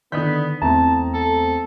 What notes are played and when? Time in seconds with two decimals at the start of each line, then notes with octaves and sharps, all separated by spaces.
0.12 D3 D#3 B3 D5 D#6 G6 B6
0.62 E2 A3 C4 A5 A#5
1.14 A4